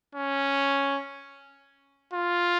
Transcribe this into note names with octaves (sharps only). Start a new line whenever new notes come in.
C#4
F4